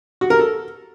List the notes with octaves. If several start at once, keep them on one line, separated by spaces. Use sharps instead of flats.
F#4
A#4
A4